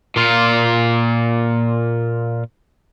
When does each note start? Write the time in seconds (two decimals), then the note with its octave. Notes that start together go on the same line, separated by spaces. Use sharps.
0.16 A#2 F4